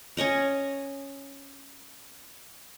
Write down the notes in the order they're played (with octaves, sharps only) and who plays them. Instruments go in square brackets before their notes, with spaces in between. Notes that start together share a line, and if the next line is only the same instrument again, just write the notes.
[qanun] C#4 C#5 D#5 A#5